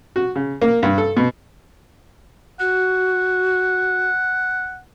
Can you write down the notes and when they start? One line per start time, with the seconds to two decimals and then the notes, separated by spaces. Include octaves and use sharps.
0.16 F#4
0.36 C#3
0.62 A#3
0.83 G2
0.98 A4
1.17 B2
2.60 F#4 F#5